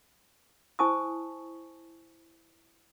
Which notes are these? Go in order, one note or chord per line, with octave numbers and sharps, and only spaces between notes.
E4 C5 G#5 A5 C#6 D#6